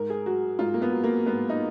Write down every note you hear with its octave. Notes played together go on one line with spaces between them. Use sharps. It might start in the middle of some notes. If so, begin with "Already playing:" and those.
Already playing: G#2 A#4
G#4
F#3 F#4
G#2 F4
A#3
B3
F#3
A#3
G#2 B3
D#4